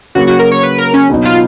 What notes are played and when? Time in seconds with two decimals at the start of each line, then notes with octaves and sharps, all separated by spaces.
0.15 C#3 F#3 A#3 F#4
0.27 F#4
0.39 A#4
0.51 C#5
0.63 B4
0.78 A#4
0.94 C#4
1.10 B2 F#3 B3 D#4
1.25 F4